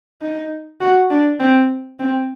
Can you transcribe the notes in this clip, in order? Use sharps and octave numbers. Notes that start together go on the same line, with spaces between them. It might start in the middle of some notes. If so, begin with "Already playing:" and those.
D#4
F#4
D4
C4
C4